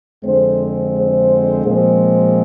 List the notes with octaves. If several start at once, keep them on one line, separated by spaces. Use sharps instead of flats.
F2 D3 G#3 C4 C5
C5
A#2 F3 G#3 C4